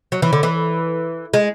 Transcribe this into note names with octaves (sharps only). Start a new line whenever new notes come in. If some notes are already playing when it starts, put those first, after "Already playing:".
F#3
E3
D3
E3
G#3